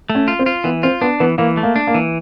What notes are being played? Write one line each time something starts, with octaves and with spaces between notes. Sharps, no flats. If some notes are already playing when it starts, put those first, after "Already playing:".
A3
C#4
F4
C4
F4
E3 B3
C4 F4
B3 D4
E3 B3
E3 A#3
A3
A#3
D4
A#3
E3